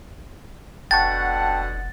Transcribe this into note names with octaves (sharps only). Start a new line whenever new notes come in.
F1 B2 D3 F#5 G5 A5 C#6 A6